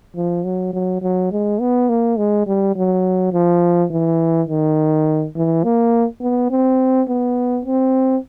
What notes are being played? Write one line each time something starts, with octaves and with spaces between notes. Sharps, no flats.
F3
F#3
F#3
F#3
G#3
B3
A#3
G#3
G3
F#3
F3
E3
D#3
E3
A#3
B3
C4
B3
C4